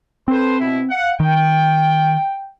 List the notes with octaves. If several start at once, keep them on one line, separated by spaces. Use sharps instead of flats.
C4 A4 B4 C5
B2 E4
F5 F#5
D#3 G5